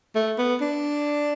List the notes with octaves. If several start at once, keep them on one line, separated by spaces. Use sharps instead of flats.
A3
B3
D4